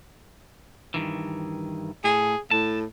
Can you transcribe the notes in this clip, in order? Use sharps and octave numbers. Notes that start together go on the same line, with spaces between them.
G2 D#3 E3
A2 G#4
A2 A5